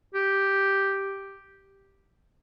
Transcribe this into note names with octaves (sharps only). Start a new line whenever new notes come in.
G4